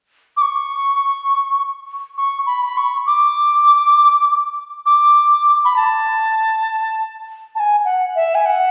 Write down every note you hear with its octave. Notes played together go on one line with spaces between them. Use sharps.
D6
C#6
C#6
B5
B5
C#6
D6
D6
B5
A5
A5
G#5
F#5
E5
G#5
F#5